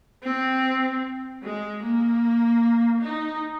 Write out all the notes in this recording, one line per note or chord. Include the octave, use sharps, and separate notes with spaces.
C4
G#3
A#3
D#4